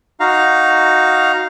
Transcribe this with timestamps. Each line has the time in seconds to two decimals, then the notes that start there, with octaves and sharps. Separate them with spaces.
0.20 D#4 F#4 F5 A#5